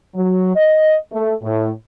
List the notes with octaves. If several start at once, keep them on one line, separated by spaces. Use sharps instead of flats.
F#3
D#5
A3
A2